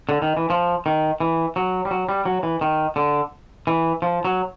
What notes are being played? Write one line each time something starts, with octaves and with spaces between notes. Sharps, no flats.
D3
D#3
E3
F3
D#3
E3
F#3
G3
F#3
G3
F#3
E3
D#3
D3
E3
F3
F#3